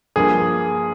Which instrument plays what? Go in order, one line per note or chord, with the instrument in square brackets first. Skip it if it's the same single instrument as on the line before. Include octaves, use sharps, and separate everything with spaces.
[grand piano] G2 F3 A#3 G#4